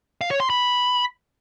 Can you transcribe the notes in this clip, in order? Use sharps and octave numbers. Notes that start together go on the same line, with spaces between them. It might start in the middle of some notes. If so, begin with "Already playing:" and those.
F5
C#5
C6
B5